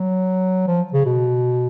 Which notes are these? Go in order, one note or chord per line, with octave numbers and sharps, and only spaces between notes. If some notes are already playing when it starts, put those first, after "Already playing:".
Already playing: F#3
F3
C#3
B2